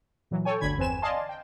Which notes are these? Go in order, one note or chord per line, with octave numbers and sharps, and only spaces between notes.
A#2 E3 F#3
A4 C#5 G5 G#5
G1 D2 D3 B5 G#6
G1 E2 C4 B4 G#5 E7
D5 D#5 F5 G#5 A5 C6
G5